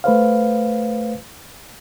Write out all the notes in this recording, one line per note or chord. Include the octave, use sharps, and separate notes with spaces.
A3 B4 C5 F5